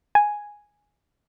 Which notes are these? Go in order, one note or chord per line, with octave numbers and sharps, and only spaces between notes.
G#5